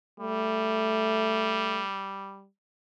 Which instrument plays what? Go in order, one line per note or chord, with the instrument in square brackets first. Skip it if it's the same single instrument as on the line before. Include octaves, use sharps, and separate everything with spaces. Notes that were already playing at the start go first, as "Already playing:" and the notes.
[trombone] G3 [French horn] A3